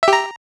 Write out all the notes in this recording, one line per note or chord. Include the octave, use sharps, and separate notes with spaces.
G4 E5 A#5